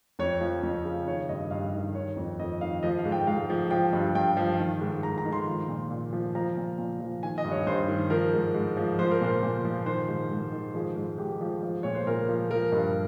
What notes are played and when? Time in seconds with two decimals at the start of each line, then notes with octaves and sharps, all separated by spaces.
0.19 F2 C#5
0.41 F3
0.63 F2
0.85 C#3
1.07 D#3 C#5
1.29 G2 D#5
1.51 G2 F5
1.74 D#3
1.95 D#3 C#5
2.17 F2
2.40 F2 D#5
2.61 D#3 F5
2.83 F3 D#5
2.98 F5
3.05 G#2
3.12 G5
3.27 G#2 F5
3.50 F3
3.71 F3 G5
3.93 G2
4.15 G2 G5
4.37 F3
4.59 D#3
4.81 G#2
5.03 G#2 A#5
5.18 A#5
5.25 D#3
5.32 C6
5.47 F3
5.68 A#2
5.91 A#2
6.13 F3
6.35 F3 A#5
6.57 A#2
6.78 A#2
7.00 F3
7.23 D#3 G#5
7.38 D#5
7.45 G2
7.52 C#5
7.67 G2 C5
7.88 D#3
8.10 F3 A#4
8.33 G#2
8.54 G#2
8.77 F3
8.99 F3 C5
9.11 A#4
9.21 A#2 C5
9.43 A#2
9.64 F3
9.86 D#3 C5
10.08 G#2
10.31 G#2
10.52 D#3
10.75 F3 G#4
10.96 G#2
11.18 G#2 G4
11.41 F3
11.63 F3
11.83 A#2 C#5
11.95 C5
12.07 A#2 A#4
12.29 F3
12.50 F3 A#4
12.72 G2